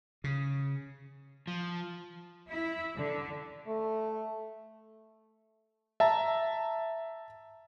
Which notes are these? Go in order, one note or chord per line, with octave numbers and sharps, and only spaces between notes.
C#3
F3
E4
D3
A3
E5 A5 A#5